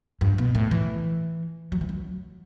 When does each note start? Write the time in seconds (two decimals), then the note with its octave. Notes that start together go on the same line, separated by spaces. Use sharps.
0.21 G2
0.38 B2
0.55 A2
0.71 E3
1.72 F#3
1.81 E3
1.89 F#3